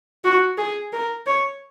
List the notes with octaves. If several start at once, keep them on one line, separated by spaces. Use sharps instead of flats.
F#4
G#4
A#4
C#5